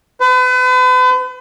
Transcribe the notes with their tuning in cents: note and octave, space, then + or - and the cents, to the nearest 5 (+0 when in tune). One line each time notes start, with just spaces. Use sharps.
B4 +40